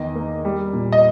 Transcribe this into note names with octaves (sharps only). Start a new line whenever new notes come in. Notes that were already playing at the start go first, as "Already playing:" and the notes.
Already playing: E2 D#3 D#5
A#3
G3
A#2
D#5